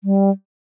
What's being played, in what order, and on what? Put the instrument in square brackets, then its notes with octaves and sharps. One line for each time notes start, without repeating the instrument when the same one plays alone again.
[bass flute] G3